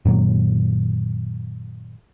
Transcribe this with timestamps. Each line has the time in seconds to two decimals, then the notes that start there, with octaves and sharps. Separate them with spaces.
0.05 F#2 A#2 D#3 F#3